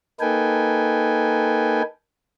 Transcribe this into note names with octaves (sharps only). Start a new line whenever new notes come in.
A#3 D#4 A4 B4 G5 G#5